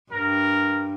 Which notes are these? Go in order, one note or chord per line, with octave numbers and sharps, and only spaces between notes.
G2 A#4